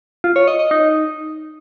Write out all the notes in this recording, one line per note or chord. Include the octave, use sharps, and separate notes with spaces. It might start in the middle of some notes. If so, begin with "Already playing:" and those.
F4
C#5
D#5
D#5
D#4